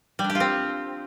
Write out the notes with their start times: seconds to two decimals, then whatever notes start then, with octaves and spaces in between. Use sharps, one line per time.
0.19 G3
0.24 D4
0.30 G4
0.35 F4
0.40 C4